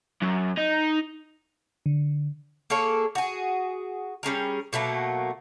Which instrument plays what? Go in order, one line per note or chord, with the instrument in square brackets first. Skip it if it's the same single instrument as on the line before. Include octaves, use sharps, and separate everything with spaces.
[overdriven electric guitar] F#2
D#4
[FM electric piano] D3
[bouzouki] A#3 G#4 A4 C#5
F#4 G#4
G3 C#4 G#4 A#4
B2 F#3 A3 A#3